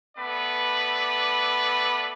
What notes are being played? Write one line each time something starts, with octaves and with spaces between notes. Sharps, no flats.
A3 B3 B4 D5